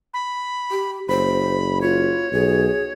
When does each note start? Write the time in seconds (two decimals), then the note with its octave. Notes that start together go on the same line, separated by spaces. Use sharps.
0.14 B5
0.71 G4
1.08 F#1 C5 B5
1.81 F4 C#5
2.32 B1 G#4